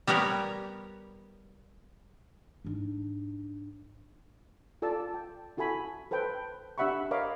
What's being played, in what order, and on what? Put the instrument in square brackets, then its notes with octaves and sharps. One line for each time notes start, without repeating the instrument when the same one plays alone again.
[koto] G3 B3 G4 A#4 C#5
[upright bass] G#2 D4
[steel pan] F4 A4 D5 A5 E6
G5
E4 F#4 A4 G#5 B5
A4 B4 C5 G5
D4 G4 E5 F#5 B5 C#6
A#4 C#5 D#5 F5 B5 D6